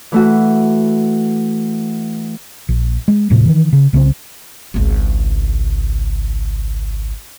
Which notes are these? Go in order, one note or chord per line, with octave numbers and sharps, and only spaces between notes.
E3 A3 F#4
A#1
G#3
D#1 A2 C3 F3
D#3 E3
C#3
C2 C#3 A3 C4
G#1 C#2